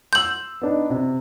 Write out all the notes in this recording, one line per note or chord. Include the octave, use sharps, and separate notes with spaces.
C6 E6 G6 F#7
B3 D4 D#4
C3